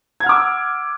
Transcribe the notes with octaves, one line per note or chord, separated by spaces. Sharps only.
F#5 D6 E6 F6 G#6